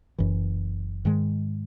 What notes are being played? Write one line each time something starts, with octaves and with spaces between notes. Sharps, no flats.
F#1 F#2 E3
G#2 D#3 G#3